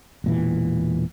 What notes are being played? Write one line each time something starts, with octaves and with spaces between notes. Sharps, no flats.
E1 A#2 E3